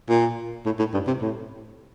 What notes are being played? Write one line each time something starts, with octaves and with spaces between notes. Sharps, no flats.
A#2
A2
A2
G2
C3
A2